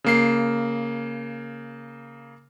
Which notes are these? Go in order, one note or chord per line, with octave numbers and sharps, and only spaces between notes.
C#3 A#3 C7